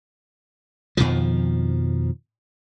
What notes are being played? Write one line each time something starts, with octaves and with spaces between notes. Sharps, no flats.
F2 B2 D#3 F3